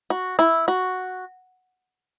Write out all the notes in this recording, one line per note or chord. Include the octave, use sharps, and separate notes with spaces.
F#4
E4
F#4